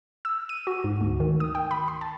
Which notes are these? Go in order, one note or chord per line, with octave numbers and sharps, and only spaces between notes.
E6
D#7
F#4
G#2
D2
D#3
D#6
G5
B5
C6
A5